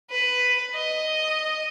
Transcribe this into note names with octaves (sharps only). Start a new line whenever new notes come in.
B4
D#5